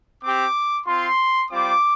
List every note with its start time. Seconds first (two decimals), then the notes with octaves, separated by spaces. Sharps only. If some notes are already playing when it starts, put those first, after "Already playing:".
0.22 C4 G4 D6
0.86 C4 F4 C6
1.50 G3 C4 F4 D6